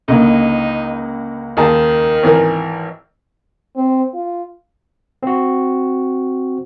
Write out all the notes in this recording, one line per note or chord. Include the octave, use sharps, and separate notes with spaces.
C#2 D3 A#3 D#4 D#5
D#2 D#3 G#4 A5
G#1 E3 A#4
C4
F4
C4 F#4